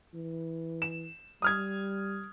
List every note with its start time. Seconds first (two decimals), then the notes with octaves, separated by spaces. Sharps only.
0.14 E3
0.82 E7
1.42 G3 D#6 F6 G#6